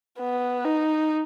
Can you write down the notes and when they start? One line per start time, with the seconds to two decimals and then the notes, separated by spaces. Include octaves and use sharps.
0.19 B3
0.65 D#4